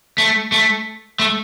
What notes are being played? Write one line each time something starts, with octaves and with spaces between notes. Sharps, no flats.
A3
A3
A3